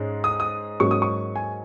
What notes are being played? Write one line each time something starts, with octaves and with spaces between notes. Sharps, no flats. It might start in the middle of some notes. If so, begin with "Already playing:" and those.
Already playing: G#2 G#3 C#4
D#6
D#6
G#2 F#3 A#3 C#4 C#6
D#6
C#6
G#5